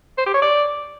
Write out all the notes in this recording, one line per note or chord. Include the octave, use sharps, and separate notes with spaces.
C5
G4
C#5
D5